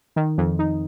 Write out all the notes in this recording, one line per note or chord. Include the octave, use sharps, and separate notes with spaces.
D#3
F2
D#4